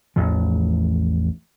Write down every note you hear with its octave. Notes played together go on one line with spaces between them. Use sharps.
A1 E2 A2 F3